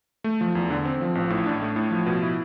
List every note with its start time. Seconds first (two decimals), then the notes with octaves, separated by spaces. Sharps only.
0.24 A3
0.41 F3
0.55 E2
0.70 D3
0.85 C4
1.01 F3
1.15 A1
1.30 A2
1.46 D4
1.62 A3
1.76 A2
1.91 F3
2.06 B2
2.22 E4